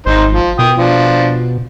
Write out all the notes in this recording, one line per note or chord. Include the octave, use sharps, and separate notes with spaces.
G#1 D#4 C5
F3
B2 G5 D#6
F3 D4